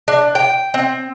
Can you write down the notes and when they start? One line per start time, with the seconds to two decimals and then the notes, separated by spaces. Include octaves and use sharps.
0.08 D4
0.35 G5
0.74 C4